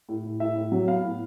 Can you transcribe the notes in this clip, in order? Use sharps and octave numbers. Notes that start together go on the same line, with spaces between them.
A2
A2
A2 E5
A2
F#3
B3 F5
A2